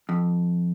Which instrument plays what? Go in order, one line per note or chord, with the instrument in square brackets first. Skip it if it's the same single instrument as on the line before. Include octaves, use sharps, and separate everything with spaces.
[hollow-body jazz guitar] F2